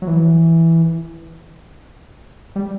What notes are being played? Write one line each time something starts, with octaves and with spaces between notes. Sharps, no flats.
F#3
E3
G3